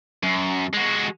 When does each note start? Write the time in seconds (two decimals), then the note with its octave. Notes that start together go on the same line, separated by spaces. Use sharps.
0.23 F#2
0.73 G#3 F#4